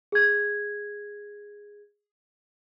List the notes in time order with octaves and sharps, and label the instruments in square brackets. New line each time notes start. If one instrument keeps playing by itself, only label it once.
[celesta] G#4 G#6